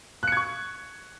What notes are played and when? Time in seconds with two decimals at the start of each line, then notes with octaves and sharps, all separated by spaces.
0.23 F#6
0.28 C#7
0.32 G#6
0.37 C#6